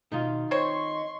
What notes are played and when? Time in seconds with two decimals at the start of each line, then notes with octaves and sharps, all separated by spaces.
0.12 B2 D#3 D#4 F4
0.51 C4 C5 C#5 D#5 C6 C#6